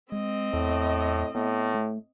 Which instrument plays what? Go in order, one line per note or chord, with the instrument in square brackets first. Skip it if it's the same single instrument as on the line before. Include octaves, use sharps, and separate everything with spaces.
[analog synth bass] G#3 [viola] C4 D#5
[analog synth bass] E2 [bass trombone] A2
[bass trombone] A2 [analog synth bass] B3
[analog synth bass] A3